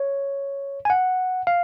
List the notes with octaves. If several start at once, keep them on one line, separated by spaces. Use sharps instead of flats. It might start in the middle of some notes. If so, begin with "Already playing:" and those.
Already playing: C#5
G#5
F#5
F5